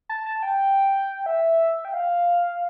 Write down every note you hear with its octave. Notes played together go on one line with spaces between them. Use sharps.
A5
A5
G5
E5
G5
F5